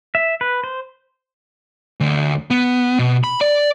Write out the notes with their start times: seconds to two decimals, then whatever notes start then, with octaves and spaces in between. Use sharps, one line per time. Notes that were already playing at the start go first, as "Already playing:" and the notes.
0.15 E5
0.41 B4
0.64 C5
2.00 D2
2.51 B3
2.99 B2
3.24 B5
3.41 D5